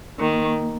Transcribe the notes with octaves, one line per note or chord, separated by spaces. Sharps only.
D#3 A#3